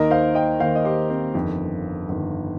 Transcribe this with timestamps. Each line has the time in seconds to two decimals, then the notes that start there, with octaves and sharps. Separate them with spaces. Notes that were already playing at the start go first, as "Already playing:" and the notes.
Already playing: D#2 D#3 A#4 D#5
0.11 C5 F5
0.35 D#5 G5
0.60 D#2 D#3 C5 F5
0.76 D#5
0.84 G4 C5
1.10 C4
1.34 G1 F2 D#3
2.09 G1 F2 D#3